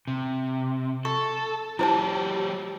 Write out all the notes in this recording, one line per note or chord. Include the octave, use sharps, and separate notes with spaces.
C3
A4 C#6
F#3 E4 G4 C5 A5